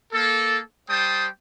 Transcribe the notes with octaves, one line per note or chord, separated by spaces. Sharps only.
A#3 A4
G3 C5 G5 A5 D#6